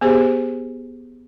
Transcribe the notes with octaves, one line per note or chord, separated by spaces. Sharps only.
B3 G4 G#4 C5